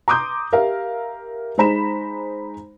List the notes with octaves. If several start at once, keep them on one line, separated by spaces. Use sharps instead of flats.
A#5 C6 D6 D#6 G6
G4 A#4 E5 F5
G#3 D#4 C5 A#5 B5 E7